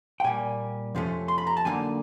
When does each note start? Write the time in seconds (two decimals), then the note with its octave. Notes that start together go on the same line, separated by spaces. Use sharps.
0.20 G5
0.24 A#2 G3 A#3 G#5
0.95 F2 C3 F3 A3 C#4
1.28 C6
1.38 B5
1.47 A#5
1.57 A5
1.65 D3 F#3 A#3 D#4 G#5